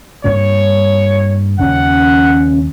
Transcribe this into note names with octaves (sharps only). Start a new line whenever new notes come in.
G2 A#3 C#5
D#2 C#3 F#3 C#4 F#5